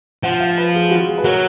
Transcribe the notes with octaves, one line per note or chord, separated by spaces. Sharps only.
F3 F#5
F5
B4
G#4
F#4
G#4
B4
F#3 A#4